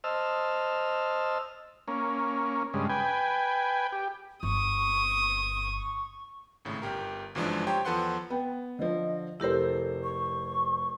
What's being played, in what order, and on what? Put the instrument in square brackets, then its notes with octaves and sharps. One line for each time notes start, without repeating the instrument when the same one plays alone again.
[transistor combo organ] C5 D#5 A5 E6 F6
A#3 C#4
G2 C#3 G#3
B4 G5 G#5
G4
[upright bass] G1 [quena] C#6 [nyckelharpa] D#6
[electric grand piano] G#1 A2 C#3
G1 G4 A#4
G1 F#2 E3 F3 G#3 D4
G4 C5 C#5 G5 A#5
E2 F3 A4 B4 F#5 C6
[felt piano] B3 G5
[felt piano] D3 F3 [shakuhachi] D#5
[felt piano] F1 C5 [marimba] E4 G4 A#4 [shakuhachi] A4
[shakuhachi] C#6